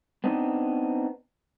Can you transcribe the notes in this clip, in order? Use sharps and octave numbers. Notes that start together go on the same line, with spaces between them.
B3 C4 D4 D#4